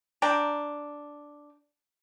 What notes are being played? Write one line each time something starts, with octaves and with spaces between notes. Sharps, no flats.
D4 G5 A#5